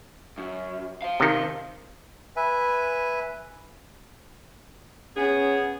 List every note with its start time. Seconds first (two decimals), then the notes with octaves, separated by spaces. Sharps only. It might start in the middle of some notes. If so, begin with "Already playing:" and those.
0.38 F#2
1.02 C5 F5
1.20 C3 D#3
2.36 B4 E5 G#5
5.17 B3 C#4 G#4